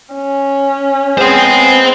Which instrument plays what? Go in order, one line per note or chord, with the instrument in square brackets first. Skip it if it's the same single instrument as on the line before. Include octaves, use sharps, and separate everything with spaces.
[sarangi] C#4
[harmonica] G#3 B3 G#4 [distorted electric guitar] C5 G5